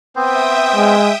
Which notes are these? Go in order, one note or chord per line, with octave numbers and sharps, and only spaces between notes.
B3 C4 C5 E5 G5 D#6
G#3